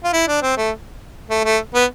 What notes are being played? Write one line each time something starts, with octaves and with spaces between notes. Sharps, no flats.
F4
E4
D4
C4
A3
A3
A3
B3